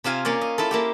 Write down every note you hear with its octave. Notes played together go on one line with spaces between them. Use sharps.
C3 C4 F4 F5 G#5
A#3 C#4 F4 D5
D#5
E4 F4 A4
A#3 E4 G4